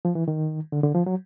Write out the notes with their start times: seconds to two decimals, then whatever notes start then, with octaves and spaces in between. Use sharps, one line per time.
0.05 F3
0.15 E3
0.28 D#3
0.72 D3
0.84 D3
0.95 F3
1.06 F#3